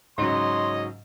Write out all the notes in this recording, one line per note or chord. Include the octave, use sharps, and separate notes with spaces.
G#2 C#3 F#3 C#5 D#5 C6